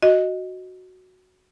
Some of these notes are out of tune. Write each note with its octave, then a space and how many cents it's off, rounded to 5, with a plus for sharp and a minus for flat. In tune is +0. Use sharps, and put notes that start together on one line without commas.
F#4 +0 D#5 +0